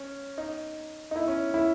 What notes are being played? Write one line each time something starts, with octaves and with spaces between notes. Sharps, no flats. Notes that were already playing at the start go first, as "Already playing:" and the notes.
Already playing: C#4
D#4
D#4
E4
C#4
E4